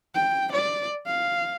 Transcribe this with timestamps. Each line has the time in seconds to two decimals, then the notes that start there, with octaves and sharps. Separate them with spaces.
0.15 G5
0.53 D5
1.07 F5